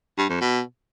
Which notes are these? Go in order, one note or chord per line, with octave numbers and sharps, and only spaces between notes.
G2
F2
B2